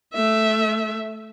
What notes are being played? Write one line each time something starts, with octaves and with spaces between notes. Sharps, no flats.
A3 E5